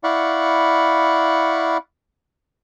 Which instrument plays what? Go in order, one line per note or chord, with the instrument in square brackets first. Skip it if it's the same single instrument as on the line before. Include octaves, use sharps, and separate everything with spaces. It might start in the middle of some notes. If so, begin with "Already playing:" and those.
[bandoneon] E4 D5 F5 F#5 B5 C#6